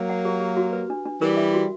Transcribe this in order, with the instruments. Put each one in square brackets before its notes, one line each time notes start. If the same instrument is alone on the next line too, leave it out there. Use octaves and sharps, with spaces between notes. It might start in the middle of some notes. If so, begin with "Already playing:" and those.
Already playing: [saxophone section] F#3 A#3
[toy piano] F#5
G4
G4
F#4
B4
D4
D4
[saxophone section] E3 G3 [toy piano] A#4
[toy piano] E5
F#4